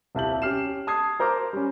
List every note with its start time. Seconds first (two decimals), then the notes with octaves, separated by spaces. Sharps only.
0.15 D#1 C2 E5 A5 G6 F#7
0.42 C#4 G4 F6 C7 E7
0.87 A5 D#6 G#6 C7
1.19 A#4 C5 A#5 D6 F6
1.53 G3 C#4